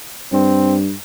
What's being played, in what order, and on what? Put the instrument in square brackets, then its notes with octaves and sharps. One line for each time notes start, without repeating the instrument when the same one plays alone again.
[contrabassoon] G2 [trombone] C4